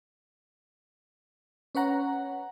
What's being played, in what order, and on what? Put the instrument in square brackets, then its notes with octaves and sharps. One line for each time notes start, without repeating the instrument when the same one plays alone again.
[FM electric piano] C#4 B4 C#5 F#5 A#5